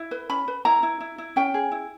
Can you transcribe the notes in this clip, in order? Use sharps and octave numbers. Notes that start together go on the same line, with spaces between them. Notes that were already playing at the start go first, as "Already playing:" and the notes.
Already playing: E4
B4
C#4 B5
B4
E4 A#5
E4
E4
E4
C#4 G5
G#4
E4